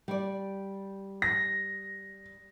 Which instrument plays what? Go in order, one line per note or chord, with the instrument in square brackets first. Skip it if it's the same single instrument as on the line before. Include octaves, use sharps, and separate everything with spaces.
[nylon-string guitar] G3 D5
[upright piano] A#6